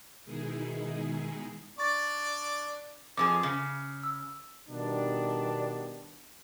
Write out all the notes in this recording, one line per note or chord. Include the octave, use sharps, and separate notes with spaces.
B2 D#3 G#3 D#4 E4 G#4
D4 D5 C#6 A6
F2 F3 G#4 D6
C#3
E6
B2 D#3 G3 B3 D4